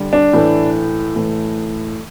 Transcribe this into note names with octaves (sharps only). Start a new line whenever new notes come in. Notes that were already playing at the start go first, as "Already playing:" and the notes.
Already playing: D3 G3
D4
A2 E3 A3
A2 E3 A3